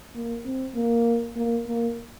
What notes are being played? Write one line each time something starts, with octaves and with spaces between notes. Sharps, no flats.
A#3
C4
A#3
A#3
A#3